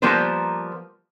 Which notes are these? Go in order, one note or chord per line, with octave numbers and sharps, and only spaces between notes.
F3 G3 A#3 B3 A#4 C5